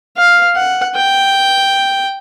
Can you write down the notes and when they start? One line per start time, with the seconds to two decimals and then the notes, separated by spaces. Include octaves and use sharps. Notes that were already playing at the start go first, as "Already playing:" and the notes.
0.17 F5
0.56 F#5
0.95 G5